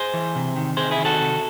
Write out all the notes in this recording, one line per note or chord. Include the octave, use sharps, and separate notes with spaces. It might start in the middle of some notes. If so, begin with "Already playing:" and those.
Already playing: G#4 C5
E3
C3
D#3
C3 G#4 C5
E4 G#4
D#3
F#4 A4
C3